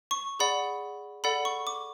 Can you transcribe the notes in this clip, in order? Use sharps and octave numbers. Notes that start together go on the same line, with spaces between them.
C#6
G#4 D5 F#5 B5
A4 D5 F#5 B5
C#6
D6